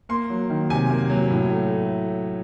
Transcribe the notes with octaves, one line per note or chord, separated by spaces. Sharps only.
A#3 C6
F#3
D#3
C3 G#5
A#3
F#3
A2
A3